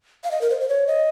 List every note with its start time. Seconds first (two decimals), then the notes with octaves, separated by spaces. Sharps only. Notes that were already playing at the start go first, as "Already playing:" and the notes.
0.24 F5
0.31 D#5
0.41 A#4
0.50 C5
0.61 C5
0.69 C#5
0.87 D#5